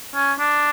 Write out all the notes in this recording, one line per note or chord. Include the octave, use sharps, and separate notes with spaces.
C#4
D4